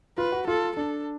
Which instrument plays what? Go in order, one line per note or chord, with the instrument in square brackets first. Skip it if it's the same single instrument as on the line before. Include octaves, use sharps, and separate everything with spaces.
[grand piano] F4 [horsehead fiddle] B4
[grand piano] F#4
[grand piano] F4 [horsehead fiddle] A4
[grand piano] D4 [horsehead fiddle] A4